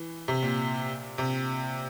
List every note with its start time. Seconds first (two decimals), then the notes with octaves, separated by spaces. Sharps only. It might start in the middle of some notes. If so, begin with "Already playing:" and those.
Already playing: E3
0.28 C3
0.43 A#2
1.18 C3